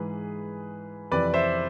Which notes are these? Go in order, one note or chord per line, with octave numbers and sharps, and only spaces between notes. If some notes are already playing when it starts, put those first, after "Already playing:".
Already playing: G#2 E3 G#4 B4
F2 C3 E3 B4 D5
C5 E5